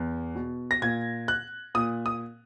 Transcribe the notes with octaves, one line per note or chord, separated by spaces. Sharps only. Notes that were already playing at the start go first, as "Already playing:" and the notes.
Already playing: E2
B2
A#6
A#2 G#6
F#6
A#2 D#6
D#6